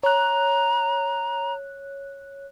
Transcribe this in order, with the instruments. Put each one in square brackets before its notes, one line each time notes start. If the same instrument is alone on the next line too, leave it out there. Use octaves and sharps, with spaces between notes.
[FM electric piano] C#5 F#6 [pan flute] A#5